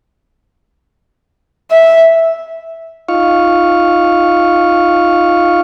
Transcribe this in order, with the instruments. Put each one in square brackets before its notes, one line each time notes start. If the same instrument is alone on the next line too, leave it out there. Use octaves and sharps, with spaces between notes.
[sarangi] E5
[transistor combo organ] D#4 F4 F5 C#6